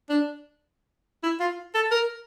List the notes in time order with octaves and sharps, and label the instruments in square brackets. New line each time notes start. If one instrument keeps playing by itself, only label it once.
[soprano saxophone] D4
E4
F4
A4
A#4